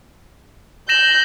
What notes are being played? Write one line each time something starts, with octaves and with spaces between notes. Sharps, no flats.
G6 A#6 E7 F#7